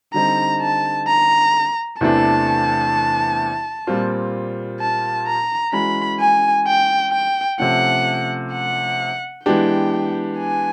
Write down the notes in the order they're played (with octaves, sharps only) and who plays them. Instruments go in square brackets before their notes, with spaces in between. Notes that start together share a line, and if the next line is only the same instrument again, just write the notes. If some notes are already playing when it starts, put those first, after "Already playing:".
[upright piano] D3 G3 C4 D#4 [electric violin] A#5
[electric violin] A5
A#5
[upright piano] E2 C3 E3 A3 D4 [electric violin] A5
[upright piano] A#2 G3 C4 F4
[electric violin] A5
A#5
[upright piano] E3 G#3 C#4 F#4 [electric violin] B5
[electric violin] G#5
G5
G5
[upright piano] C3 F3 A3 C#4 [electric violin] F#5
[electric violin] F#5
[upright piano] E3 G#3 B3 D4 G4 [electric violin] G5
[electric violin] G#5